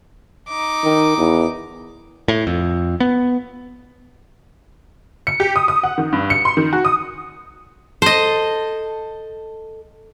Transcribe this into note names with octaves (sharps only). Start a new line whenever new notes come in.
D#4 D6
D#3
E2
A2
F2
B3
C#7
G4
D#6
D#6
F#5
D#3
G2
C#7
C6
D#3
F#4
D#6
A4 C5 D#5